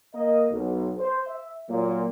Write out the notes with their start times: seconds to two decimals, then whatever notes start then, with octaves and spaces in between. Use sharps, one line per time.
0.15 A#3 D#5
0.51 B1
0.98 C5
1.27 E5
1.70 A#2 F#3 A#3